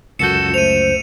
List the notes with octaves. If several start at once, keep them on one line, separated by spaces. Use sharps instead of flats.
C#2 F#2 F#4 A4 G6 C#7 E7
A3 C5 D#7 F7